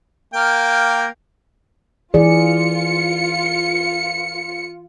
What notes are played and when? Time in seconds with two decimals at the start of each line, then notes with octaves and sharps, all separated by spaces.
0.34 A#3 F5 G5
2.14 E3 F4 G#4 D5 C#7